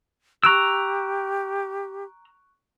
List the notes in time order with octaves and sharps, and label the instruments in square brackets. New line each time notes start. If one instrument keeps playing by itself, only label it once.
[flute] G4 [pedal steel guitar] A#5 E6 [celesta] C#6 F#6 D7